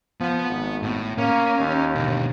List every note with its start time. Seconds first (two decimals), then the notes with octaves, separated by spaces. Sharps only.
0.21 F3 B3 F#5
0.49 G#1
0.83 A2
1.18 A#3 C#4
1.59 D#2
1.95 B2 D3